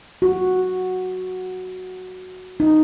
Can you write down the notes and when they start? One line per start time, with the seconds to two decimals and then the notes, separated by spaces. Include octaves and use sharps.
0.22 F#4
2.60 D#4